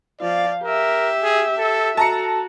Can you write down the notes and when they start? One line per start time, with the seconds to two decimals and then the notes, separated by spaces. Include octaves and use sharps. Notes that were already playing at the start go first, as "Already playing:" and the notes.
0.21 F3 D5 F5
0.63 G4 A#4 E5
1.23 G#4
1.58 A4
1.97 F#4 A4 A5 A#5 C#7